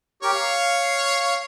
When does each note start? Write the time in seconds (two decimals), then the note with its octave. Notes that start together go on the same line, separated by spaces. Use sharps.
0.23 G4 A#4 C#5
0.35 F5